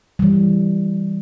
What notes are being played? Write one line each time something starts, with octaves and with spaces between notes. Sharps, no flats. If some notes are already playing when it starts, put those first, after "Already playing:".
E3 G3